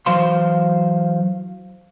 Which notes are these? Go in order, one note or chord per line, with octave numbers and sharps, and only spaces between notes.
E3 F#3 C5 F5 C6